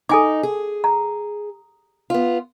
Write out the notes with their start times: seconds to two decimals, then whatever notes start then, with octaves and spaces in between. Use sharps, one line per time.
0.09 D#4 A4 G#5 D6
0.43 G#4
0.84 A#5
2.10 B3 F4